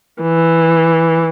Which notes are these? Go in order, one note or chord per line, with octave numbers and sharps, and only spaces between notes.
E3